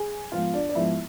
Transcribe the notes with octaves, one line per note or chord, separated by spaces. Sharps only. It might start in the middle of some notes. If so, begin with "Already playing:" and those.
Already playing: G#4 G#5
G#2 F3 B3 F4 F5
D4 D5
D5
G#2 F3 B3 E4 E5